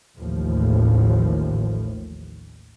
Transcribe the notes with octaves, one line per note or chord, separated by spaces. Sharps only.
A1 D#2 A2 F3